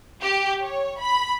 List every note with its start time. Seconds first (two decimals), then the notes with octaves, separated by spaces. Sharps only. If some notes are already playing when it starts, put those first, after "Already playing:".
0.22 G4
0.61 C#5
0.98 B5